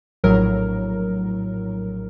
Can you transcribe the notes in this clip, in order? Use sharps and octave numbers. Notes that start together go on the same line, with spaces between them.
A#1 A2 F#3 A#4